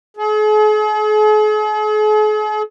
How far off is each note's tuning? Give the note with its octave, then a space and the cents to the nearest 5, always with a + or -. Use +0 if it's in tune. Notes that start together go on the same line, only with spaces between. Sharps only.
G#4 +45